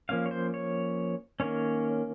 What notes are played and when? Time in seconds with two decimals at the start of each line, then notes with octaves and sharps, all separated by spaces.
0.09 F3 A#3 C#4 F5
0.26 C#5
0.31 C5
0.54 C#5
1.40 D#3 A#3 C#4 C#5